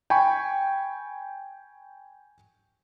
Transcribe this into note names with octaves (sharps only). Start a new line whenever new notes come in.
G5 G#5 B5 C#6